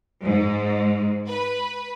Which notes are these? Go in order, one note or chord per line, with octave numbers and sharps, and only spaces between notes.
G#2
B4